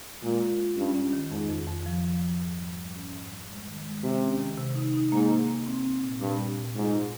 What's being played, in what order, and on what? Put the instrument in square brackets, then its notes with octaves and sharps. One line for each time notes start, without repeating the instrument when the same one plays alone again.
[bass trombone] A#2 [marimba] G#3
[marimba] F4
F4
[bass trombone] G2 [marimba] C#4
[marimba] C#4
D#3
[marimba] F2 [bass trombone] G#2
[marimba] F2
F2
F3
F3
F3
G#2
G3
G#2
C#4
G#2
G3
G#3
D#3
G#3
[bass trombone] C3 [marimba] G#3
[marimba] C#4
D#3
C3
D#4
D#4
[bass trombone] G#2 [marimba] A#3
[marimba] A#3
A#3
C4
C4
A#2
[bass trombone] G2 [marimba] A#2
[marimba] A#2
A#2
[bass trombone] G#2 [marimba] F4
[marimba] G3